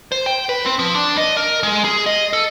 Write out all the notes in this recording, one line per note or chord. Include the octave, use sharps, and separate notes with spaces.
C5
G5
B4
C4
F3
D4
D#5
A#4
G#3
G#4
D#5
A4